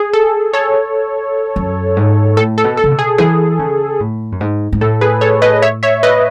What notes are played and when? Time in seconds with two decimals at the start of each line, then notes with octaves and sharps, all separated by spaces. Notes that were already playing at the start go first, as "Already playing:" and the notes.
Already playing: G#4
0.13 A4
0.53 A4 C#5
1.56 F#2
1.97 G#2
2.37 A2 A4
2.58 A4
2.64 B2
2.77 A4
2.84 C#3
2.91 B2
2.99 G#4
3.18 E3 G#4
3.59 C#3
4.00 A2
4.32 F#2
4.41 G#2
4.73 G#2
4.81 A2 A4
5.01 G#4 B4
5.21 A4 C#5
5.42 B4 D#5
5.62 C#5 E5
5.83 C#5 E5
6.03 B4 D#5